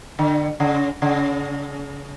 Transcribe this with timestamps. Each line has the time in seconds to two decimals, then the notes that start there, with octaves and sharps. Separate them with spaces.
0.19 D3
0.60 C#3
1.02 C#3